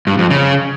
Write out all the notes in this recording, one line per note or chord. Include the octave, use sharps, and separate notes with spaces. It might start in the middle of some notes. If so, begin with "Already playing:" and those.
G2
F2
C#3